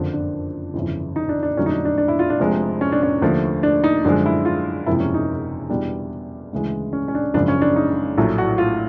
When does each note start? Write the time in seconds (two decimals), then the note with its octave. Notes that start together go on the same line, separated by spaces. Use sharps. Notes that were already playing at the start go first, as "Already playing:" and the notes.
Already playing: F#1 F2 D3 F3
0.13 D4
0.74 G1 F2 C#3 E3
1.16 D#4
1.29 D4
1.43 D4
1.57 F2 D3 F#3 A3 C#4
1.66 D#4
1.70 D4
1.85 D4
1.98 D4
2.08 E4
2.19 F4
2.30 D4
2.40 F1 F2 C3 F3 G#3
2.81 C#4
2.92 D4
3.03 C#4
3.22 D#2 D3 F3 A3
3.63 D4
3.84 D#4
4.05 F#2 D3 F3 G#3 D4
4.26 E4
4.45 F4
4.86 F#1 E2 C3 F3 G#3 E4
5.00 C#4
5.14 D#4
5.70 E2 B2 G3 D4
6.53 D2 C#3 E3 G#3
6.93 C#4
7.08 C#4
7.15 D4
7.34 G#1 F#2 C#3 F3 D4
7.48 C#4
7.62 D4
7.76 D#4
8.17 A#1 A2 F#3 A3
8.38 F#4
8.58 F4